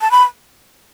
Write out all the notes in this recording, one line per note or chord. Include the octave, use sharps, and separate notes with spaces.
A5
B5